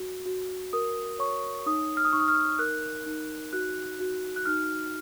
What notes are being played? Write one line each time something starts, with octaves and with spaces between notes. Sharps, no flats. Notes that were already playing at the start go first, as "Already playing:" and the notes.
Already playing: F#4
F#4
A#4 D#6
C#5 C#6
D#4 D#6
F6
D#6
D#4 C#6
D#6
F6
A#4 F#6
D#4
F#4 F#6
F#4
F#6
D#4 F6